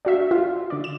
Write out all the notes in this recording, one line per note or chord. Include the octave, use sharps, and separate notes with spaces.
D4 F#4 E5
F4
D3 D5
E7